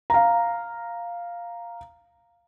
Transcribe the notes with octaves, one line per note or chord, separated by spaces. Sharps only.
F5 A#5